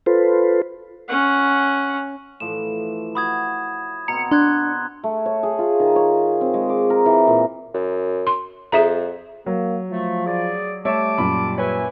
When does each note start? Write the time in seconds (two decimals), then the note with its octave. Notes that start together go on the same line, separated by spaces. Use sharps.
0.06 F4 A4 B4 C5
1.08 C#4 F#5
2.40 A2 E3 F3 E7
3.15 F#4 B5 D#6 G#6
4.08 B2 C4 A#5 C#7
4.31 D4 C6 F#6 G#6
5.04 A3
5.26 C#5
5.43 G#4
5.59 F4
5.80 D#3
5.96 C#5
6.41 C4
6.54 G#3
6.69 D6
6.90 A#4
7.06 E3
7.27 A#2
7.74 F#2
8.27 C6
8.72 F2 G#4 E5 A#5
9.46 F#3 A#3
9.91 F3 A3
10.26 G#4 D5
10.85 G3 A3 C#5 E5 A5 D6
11.18 F#2 A#2 B5
11.58 B4 C#5 E5 G#5